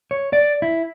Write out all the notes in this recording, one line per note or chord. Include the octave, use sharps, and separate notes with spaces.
C#5
D5
E4